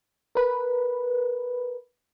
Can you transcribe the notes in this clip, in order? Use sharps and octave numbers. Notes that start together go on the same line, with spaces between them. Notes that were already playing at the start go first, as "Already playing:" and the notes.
A#4 B4